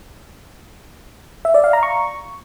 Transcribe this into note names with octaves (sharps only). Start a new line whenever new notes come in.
E5
D5
F5
A#5
C#6